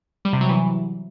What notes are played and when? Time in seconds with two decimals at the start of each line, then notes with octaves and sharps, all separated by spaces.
0.25 G3
0.33 C3
0.41 F#3
0.49 E3